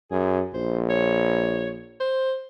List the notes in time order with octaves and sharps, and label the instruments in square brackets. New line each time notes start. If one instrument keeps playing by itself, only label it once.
[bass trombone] F#2 [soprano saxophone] G#4
[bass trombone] A#1 [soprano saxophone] C5
[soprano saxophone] C#5
C5